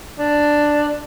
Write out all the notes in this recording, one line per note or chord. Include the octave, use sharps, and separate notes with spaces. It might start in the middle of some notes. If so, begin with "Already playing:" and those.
D4